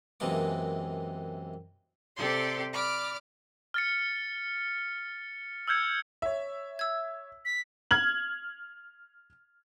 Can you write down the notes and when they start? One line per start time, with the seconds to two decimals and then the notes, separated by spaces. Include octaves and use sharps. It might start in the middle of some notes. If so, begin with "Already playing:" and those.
0.20 F#2 C3 E3 G#3 A#3 D6
2.16 C3 C4 G4 A4 D5 C6
2.73 D5 B5 D6 F6
3.74 F6 A6 C#7
5.68 E6 F6 G6 G#6 C#7
6.22 C#5 E5
6.79 E6 G#6
7.45 B6
7.91 F6 G#6 F#7